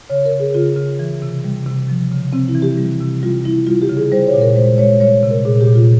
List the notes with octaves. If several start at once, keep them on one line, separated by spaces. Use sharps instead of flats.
C#3 C#5
A#4
C#3
G#4
C#3 F4
C#3
E3
C3
G3
C3
F3
C#3
C3 C4
E4
E3
G4
G3
C3
G3 F4
G3 E4
G3 F4
G4
C#3
G#4
G3 C5
C#5
A#2
A#4
G#3 C5
G#3 C#5
G3 C#5
C3
A#4
A#2 G#4
G4
A#2
F4